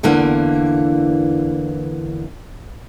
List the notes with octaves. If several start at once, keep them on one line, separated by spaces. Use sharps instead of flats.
E2 D3 E3 A#3